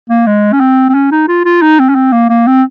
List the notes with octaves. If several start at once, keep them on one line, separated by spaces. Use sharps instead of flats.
A#3
G#3
C#4
C4
C4
C#4
D#4
F4
F4
D#4
C4
C#4
C4
A#3
A#3
C4